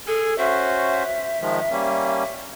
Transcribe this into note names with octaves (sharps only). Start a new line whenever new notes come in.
G#4 A4 G#5
C#4 F#4 C5 E5
D#3 F3 G#3
G3 A#3 C#4